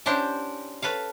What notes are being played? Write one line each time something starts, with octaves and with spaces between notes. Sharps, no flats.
C#4 D4 E4 G4 C5
A4 B4 C#5 F5